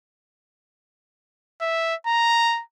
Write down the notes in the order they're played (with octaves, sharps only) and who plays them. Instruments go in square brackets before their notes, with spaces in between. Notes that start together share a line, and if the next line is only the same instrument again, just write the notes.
[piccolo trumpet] E5
A#5